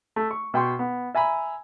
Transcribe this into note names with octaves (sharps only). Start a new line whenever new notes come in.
A3
C#6
B2 G5 C6 C#6
B3
E5 G#5 A#5 B5